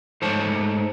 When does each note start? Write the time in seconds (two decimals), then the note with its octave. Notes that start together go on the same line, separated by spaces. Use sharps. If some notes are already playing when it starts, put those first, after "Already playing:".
0.22 G#2 A3 C5 C#5 A5